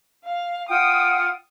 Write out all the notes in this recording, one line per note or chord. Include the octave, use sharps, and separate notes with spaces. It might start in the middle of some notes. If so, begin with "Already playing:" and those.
F5
F4 F#5 G5 D#6